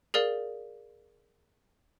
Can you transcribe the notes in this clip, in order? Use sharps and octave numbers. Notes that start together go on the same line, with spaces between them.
G#4 A#4 D5 F5